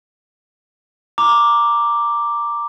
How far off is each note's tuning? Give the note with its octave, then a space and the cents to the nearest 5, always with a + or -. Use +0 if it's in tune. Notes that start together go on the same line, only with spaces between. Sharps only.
A#5 +0 D6 +0